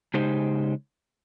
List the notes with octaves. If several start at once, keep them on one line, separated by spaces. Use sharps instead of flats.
C#3 G#3 D#4 G4 C5